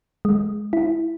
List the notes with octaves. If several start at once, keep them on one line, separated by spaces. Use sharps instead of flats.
G#3
E4